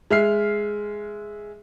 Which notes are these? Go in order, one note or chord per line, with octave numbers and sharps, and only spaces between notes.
G#3 E5 F6 C7